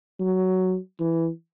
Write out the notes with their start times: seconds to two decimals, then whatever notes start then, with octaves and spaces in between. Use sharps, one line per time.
0.20 F#3
0.99 E3